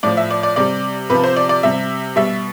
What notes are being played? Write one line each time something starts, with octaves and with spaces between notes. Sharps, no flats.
A2 F3 D5
E5
D5
D5
C3 G3 D5
C3 F3 B4
C5
D5
D5
C3 G3 E5
B2 G3 E5